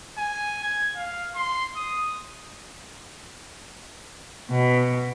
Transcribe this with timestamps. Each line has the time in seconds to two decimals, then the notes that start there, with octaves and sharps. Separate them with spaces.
0.18 G#5
0.64 G#6
0.96 F5
1.35 C6
1.76 D#6
4.50 B2